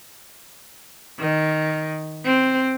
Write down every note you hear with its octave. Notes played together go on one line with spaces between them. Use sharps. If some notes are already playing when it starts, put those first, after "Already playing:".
D#3
C4